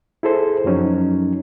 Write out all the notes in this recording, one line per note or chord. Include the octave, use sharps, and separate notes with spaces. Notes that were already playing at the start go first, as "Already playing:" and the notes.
E4 G#4 A4 C5
F#2 F3 F#3 C#4 D#4